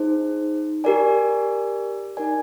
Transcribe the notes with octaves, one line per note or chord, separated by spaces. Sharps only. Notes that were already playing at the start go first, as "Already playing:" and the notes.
Already playing: D#4 G#4 C5
G4 A#4 D5 G#5
D#4 A#4 D5 G#5